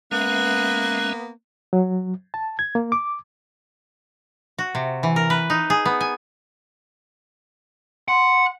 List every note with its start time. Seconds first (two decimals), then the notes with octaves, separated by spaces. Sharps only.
0.11 G#3 A#3 B3 C#4 E5 F#6
1.73 F#3
2.34 A5
2.59 G#6
2.75 A#3
2.92 D6
4.58 F#4
4.75 C3
5.03 E3
5.16 A#4
5.30 B4
5.50 D#4
5.70 G#4
5.85 B3
6.01 G#5
8.08 F#5 C6